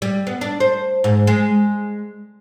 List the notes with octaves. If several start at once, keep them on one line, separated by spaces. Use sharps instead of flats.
G3
B3
D4
C5
G#2
G#3